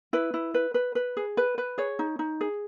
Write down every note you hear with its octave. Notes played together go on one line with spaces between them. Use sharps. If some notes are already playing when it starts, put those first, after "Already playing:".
E4 B4
E4
B4
B4
B4
G#4
B4
B4
G#4 C#5
D#4
D#4
G#4